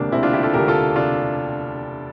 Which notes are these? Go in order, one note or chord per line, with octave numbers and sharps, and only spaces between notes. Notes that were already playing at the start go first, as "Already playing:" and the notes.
Already playing: E1 D2 C3 A#3 D4
E1 D2 C3 C4 E4
D4 F4
E4 G4
F4 A4
E1 D2 C3 G4 A#4
F4 A4
C3 D4 F4